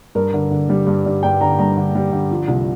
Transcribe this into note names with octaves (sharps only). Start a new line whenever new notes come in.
G2 A#4
D3
D3
G3
G2
G3
G2 G5
D3 A#5
G2 A#5
D3
G3
D3
F3
C2